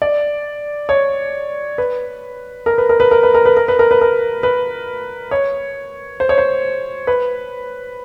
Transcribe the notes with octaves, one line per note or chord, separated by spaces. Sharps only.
D5
C#5
B4
A#4
B4
A#4
B4
A#4
B4
A#4
B4
A#4
B4
A#4
B4
A#4
B4
C#5
C5
C#5
C5
B4